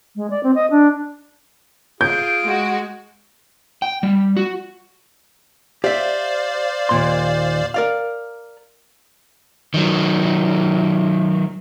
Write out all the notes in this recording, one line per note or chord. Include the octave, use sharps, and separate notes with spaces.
G#3
D5
C4
D#5
D4
F4 G#4 G6 D7
G#3 F#4
G5
G3
F#4
G4 C5 D5 E5 F5
D#2 A#2 C6
A#4 D5 F5
D#3 F#3